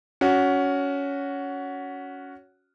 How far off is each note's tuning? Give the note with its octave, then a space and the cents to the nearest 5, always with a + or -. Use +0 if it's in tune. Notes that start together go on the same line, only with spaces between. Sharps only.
C#4 +15 F#4 +0